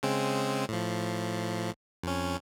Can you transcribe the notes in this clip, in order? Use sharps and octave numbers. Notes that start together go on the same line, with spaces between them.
C#3 G#3 C4
A2 F3
F2 C#4